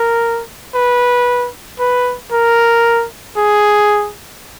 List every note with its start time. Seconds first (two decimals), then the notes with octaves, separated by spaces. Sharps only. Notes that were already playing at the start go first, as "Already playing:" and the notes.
Already playing: A#4
0.75 B4
1.80 B4
2.32 A#4
3.37 G#4